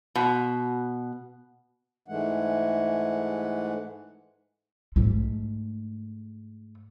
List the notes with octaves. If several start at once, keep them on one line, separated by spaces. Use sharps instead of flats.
B2
G#2 E3 G#3 A3 F#5
G#2 A3